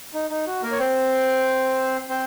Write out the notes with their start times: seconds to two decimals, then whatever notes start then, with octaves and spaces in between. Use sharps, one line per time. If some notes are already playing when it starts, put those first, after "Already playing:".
0.14 D#4
0.30 D#4
0.47 F#4
0.63 A#3 A#4
0.72 C#5
0.79 C4 C5
2.09 C4 C5